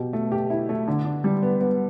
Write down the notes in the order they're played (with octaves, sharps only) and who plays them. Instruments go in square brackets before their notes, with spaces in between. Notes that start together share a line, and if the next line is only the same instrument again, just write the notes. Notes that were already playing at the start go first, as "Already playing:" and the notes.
Already playing: [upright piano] B2 G4
A3
G4
E4
A3
D3
D4
G3
B3
B3